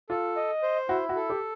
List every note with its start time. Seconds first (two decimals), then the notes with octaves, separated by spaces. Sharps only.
0.09 F4 A4
0.36 D#5
0.63 C5
0.89 E4 F#4
1.09 F#4
1.16 A4
1.30 G4